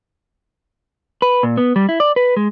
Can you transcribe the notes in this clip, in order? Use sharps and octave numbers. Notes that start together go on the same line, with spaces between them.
B4
A#2
B3
G3
E4
D5
B4
G#3